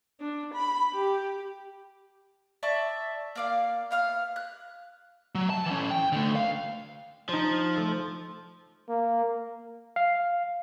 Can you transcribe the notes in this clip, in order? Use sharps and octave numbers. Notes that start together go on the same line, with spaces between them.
D4
B5
G4
D5 E5 A5 C#6
A#3 D5 F5
B3 F5 F6
F#6
F#3
A5
E3 C#4
G5
D3 A3
F5
F3 D#4 C5
A3
A#3
F5